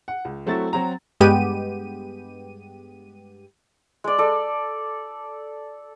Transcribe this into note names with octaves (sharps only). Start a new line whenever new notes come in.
F#5
C#2
F#3 A3 C4 E4 F#4 A6
F#3 C4 F#4 A#5
G2 G#3 B3 G4 D#7
G#3 D5
A4 D5